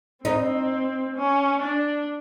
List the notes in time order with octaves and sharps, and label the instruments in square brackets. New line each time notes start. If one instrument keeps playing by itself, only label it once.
[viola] C4 [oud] D#4
[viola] C#4
D4